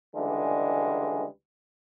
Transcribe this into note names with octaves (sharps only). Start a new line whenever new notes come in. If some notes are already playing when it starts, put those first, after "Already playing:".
C#2 D3 E3 G3 G#3